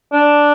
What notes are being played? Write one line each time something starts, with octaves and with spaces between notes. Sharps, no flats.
D4